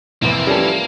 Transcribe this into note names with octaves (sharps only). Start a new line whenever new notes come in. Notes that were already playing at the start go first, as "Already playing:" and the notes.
C2 F2 C3 A#3 E4 B4
F3 G3 C#4 F4 A4